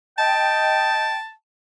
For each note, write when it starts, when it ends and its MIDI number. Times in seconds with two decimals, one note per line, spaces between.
0.18 1.17 75
0.18 1.17 79
0.18 1.31 81